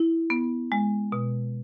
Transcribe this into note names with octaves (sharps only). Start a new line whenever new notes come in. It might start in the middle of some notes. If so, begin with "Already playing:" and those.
Already playing: E4
B3
G#3
B2